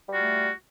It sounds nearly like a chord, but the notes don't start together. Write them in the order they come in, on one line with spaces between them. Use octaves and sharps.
G3 F#4 F4 A3